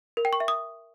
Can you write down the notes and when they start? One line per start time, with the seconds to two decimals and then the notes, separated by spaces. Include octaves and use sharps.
0.17 A#4
0.25 G5
0.33 C#6
0.40 E5
0.48 D#6